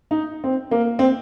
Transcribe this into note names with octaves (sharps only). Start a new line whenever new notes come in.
D#4
C4
A#3
C4